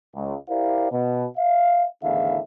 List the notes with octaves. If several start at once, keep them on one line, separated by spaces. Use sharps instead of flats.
C#2
E4 G4 A#4 C5 D5 F5
B2
E5 F5
E2 A2 D3 D#3 E5 F5